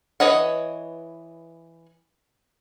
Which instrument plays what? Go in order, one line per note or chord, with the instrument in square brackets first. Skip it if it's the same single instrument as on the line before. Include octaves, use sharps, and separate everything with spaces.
[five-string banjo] E3 B4 C#5 D#5 F#5